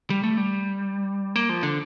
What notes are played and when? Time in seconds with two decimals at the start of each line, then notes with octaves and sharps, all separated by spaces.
0.10 G3
0.24 A3
0.37 G3
1.35 A#3
1.50 F3
1.63 D3